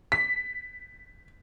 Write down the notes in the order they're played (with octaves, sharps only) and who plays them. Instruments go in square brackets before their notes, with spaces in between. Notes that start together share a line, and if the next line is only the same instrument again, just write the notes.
[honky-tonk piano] B6